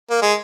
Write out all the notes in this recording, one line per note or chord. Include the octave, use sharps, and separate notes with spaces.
A#3
G#3